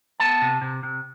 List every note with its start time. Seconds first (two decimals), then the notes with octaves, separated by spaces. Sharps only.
0.20 B3 A5
0.42 C3
0.61 C3
0.83 C3